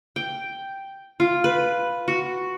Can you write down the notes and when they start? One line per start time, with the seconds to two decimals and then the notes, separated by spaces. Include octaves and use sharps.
0.16 G5
1.20 F4
1.44 B4
2.08 F#4